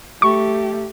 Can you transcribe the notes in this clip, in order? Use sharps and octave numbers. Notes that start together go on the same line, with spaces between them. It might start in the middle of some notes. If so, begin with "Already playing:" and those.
A3 G4 C#6